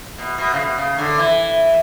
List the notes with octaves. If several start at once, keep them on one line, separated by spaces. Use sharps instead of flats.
B2
B2
C#3
B2
C#3
D3
E3